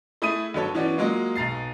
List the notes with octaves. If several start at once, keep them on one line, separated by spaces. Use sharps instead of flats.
A3 E4 G#4 B5 D#6 D#7
G1 F#3 A4 C#5
E3 B3 C#4 F#4 D5
F#3 G#3 A#3 F4
B1 B2 A#5 A6 C7